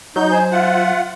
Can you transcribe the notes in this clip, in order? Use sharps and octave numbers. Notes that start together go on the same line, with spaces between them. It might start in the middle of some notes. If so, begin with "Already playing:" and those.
F#3 D#4 G6
C5 G#5
F4 E5 F#5